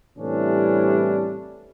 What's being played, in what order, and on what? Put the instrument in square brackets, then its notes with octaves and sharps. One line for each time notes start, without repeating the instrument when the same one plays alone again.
[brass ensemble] A2 C3 E3 G3 C#4 D4